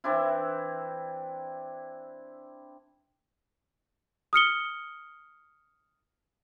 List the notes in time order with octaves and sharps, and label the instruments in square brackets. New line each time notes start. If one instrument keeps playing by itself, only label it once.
[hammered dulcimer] E3 C4 D4 E4
[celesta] D#6 F6 C#7 G7